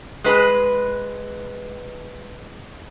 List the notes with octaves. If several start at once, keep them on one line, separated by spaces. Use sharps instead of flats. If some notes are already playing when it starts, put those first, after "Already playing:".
G#3 B4